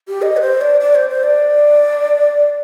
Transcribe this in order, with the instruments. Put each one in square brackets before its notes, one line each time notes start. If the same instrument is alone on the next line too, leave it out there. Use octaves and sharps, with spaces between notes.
[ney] G4
D#5
B4
C5
D5
D5
C5
C5
D5